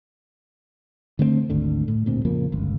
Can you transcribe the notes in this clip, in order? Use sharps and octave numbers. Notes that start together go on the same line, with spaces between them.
D3 A3 A#3 C4
G#1 D2 D3
A2
D2 A#2 C4
F2 C#3 F3 A#3
G1 C#2